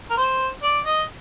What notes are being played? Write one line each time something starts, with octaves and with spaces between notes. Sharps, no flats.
A#4
C5
D5
D#5